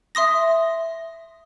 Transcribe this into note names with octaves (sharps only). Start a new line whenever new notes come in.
E5 C6 D#6 A#6